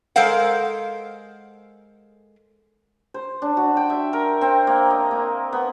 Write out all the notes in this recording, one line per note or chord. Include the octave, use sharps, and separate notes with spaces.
G#3 A4 A#4 C5 F5 F#5
C5
D4
F#4
G5
E5
A#4
C4
A#3
D#5
A#3
B3